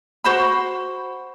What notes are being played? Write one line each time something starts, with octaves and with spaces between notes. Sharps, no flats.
F#4 C5 B5